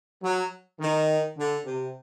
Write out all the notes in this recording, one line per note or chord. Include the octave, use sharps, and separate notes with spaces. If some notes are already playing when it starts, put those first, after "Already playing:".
F#3
D#3
D3
C3